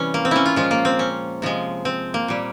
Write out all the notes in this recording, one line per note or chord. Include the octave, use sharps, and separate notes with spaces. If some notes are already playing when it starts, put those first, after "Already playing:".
Already playing: C3 E3 G3 C#4
A#3
C4
C#4 E4
F4
A#2 F3 G#3 F4
A#3
C4
C#4
C3 F3 G#3
C4
A#3
A#2 G3